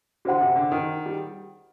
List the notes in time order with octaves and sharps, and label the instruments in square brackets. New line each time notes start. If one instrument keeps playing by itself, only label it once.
[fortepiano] D3 [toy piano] F#4 C5 F#5 C6
[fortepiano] C3
D3
D#3
G3